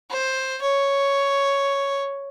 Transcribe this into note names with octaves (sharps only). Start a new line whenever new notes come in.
C5
C#5